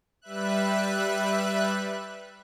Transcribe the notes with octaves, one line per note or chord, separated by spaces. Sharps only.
G3 B4 E5 F#6